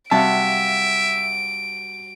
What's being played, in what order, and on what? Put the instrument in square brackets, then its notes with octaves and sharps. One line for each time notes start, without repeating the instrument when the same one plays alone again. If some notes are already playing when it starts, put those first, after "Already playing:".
[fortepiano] C3 A5 [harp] G3 F#4 F5 [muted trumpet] E5 [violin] D7